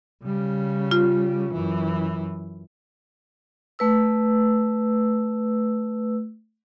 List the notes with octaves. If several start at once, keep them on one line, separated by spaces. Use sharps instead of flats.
C#3 G3
F4
F#2 E3
A3 B4 E6